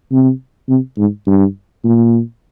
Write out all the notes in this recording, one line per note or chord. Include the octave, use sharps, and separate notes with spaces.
C3
C3
G#2
G2
A#2